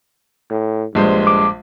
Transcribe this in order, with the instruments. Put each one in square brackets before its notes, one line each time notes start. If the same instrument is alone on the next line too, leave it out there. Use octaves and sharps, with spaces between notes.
[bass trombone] A2
[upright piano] A#1 G#3 C5 [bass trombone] G2
[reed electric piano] D6